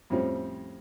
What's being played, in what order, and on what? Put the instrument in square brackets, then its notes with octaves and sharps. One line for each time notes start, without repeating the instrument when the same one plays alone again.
[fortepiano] F2 A2 F3 G3 C4 C#4